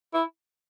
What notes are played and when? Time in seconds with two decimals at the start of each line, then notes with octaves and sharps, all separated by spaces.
0.14 E4